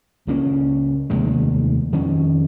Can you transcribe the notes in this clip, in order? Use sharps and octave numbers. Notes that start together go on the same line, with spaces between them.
C#2 C#3 A#3 C#4
F1 D#2 D#3 G#3
F2 D#3 C#4